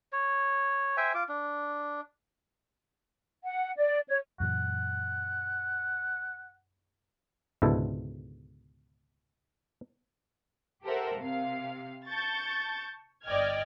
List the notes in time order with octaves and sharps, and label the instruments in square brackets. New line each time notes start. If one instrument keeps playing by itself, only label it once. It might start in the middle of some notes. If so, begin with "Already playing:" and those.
[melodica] C#5
C5 E5 G5 G#5
F4 D6
D4
[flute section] F#5
D5
C#5
[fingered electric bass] F#2 A#2 E3 [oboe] F#5
[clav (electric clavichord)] C#2 G#2 B2 D3 E4 A4
[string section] G4 A4 A#4 C5 E5 F#5
C3 F5
A5 C#6 G6 A6
G1 D5 D#5 G5 F6 G#6